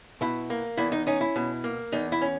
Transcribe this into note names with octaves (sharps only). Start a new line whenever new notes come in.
B2 E4
A#3
E2 E4
D#4
C#4 D#4
E4
B2
A#3
E2 D#4
E4
C#4